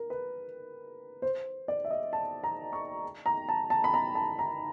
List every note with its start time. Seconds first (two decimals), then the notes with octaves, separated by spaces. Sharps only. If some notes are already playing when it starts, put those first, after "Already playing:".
Already playing: A#4
0.10 B4
1.22 C5
1.68 D5
1.85 E5
1.90 D#5
2.13 A5
2.44 A#5
2.73 C#6
3.26 A#5
3.49 A5
3.70 A5
3.84 B5
3.94 A#5
4.15 A5
4.39 A#5